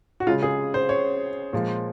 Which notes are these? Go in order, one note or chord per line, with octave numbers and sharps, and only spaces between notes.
F#4
C#3 G#3 F4
G#4
C5
C#5
A#2 F3 G#3